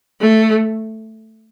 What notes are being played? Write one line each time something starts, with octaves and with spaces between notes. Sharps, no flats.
A3